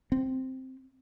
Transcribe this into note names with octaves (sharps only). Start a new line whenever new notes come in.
C4